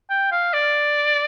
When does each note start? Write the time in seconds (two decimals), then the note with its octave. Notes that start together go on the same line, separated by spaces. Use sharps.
0.10 G5
0.32 F5
0.54 D5